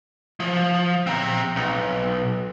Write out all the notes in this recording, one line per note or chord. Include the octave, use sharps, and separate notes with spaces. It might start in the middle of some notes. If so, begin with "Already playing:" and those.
F3
C4 A#5
B1